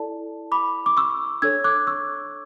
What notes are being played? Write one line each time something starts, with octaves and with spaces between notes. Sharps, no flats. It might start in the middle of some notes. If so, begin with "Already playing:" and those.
Already playing: E4 A4 D5 A5
B5 D6
D6
C#6 E6
D4 A4 C#5 E6 G#6
D6 F#6
C#6 E6